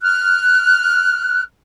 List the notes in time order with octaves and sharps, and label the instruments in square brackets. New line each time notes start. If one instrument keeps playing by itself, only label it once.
[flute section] F6 F#6